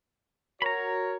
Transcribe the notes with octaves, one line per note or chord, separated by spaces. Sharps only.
F#4 A#4 C#5 A#5 B5